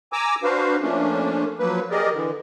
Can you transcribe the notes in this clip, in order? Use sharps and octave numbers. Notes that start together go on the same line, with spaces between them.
G#5 A#5 D6 E6
D4 F#4 B4 C5 F5
F3 A3 A#3 C#4 D4
F3 F#3 A#3 B4
G4 G#4 A#4 D5 D#5
D3 E3